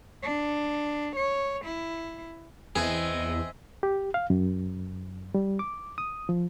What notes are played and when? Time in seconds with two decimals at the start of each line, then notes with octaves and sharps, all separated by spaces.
0.23 D4
1.16 C#5
1.65 E4
2.76 E2 E3 C4 G#4 D#5
3.83 G4
4.14 F5
4.30 F#2
5.35 G3
5.59 D6
5.98 D#6
6.29 F3